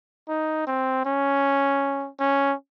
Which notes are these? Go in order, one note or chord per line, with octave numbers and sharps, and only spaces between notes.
D#4
C4
C#4
C#4